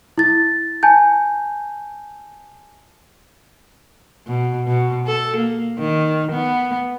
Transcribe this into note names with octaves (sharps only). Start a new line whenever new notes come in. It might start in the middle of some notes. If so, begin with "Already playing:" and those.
E4 A6
G#5 A5 G6
B2
B2
A4
A#3
D#3
B3